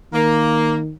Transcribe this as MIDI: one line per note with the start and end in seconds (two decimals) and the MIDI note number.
0.13 0.92 51
0.13 0.76 58